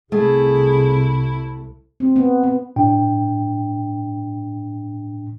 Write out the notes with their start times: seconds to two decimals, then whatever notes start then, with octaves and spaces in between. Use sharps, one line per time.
0.12 C2 C3 A3 E4 G#4
2.00 C4
2.16 B3
2.43 B3
2.76 A2 D4 G5